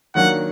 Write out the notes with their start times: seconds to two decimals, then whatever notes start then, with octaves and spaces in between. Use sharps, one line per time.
0.15 D#3 F#3 A#3 D4 F#5